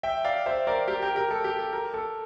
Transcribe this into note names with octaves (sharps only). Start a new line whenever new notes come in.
E5 G5
D5 F5
C5 E5
A#4 D5
G4 A#4
G4 A#4
G4 A#4
A4
G4
A4
G4 A#4
A4